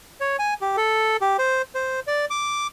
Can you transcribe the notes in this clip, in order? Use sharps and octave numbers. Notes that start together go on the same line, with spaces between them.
C#5
G#5
G4
A4
G4
C5
C5
D5
D6